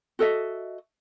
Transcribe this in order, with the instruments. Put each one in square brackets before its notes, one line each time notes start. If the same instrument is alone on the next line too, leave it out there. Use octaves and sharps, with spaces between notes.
[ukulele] F#4 A4 D#5 E5